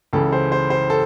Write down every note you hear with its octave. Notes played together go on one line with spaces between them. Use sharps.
C#2 C#3 E3 A4
C5
C5
C5
A4